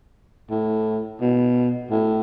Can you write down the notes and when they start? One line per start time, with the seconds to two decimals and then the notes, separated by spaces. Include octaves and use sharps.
0.50 A2
1.21 B2
1.91 A2